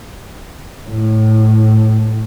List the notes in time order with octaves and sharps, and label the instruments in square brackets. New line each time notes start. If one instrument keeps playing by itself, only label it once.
[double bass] A2